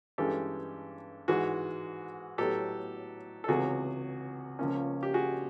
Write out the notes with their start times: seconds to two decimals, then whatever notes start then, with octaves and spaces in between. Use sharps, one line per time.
0.18 G2 E3 G#3 C#4 G4 A4
1.28 G#2 E3 G#3 F#4 G#4
2.38 A2 F#3 B3 G4 A4
3.44 A4
3.48 C#2 C3 E3 F#4 G#4
4.59 C#2 C#3 F3 A#3 C#4
5.03 G4
5.14 F#4 G#4